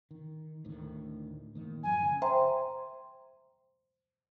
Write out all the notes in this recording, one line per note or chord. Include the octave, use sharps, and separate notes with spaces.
D#3
D2 A2 D#3
A2 D#3 A#3
F#2 F3 G#5
C#3
C5 E5 G5 A#5 C6